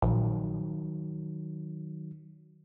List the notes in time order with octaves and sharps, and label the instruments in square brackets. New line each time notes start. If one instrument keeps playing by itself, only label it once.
[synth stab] A#1 [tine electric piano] D#3 F#3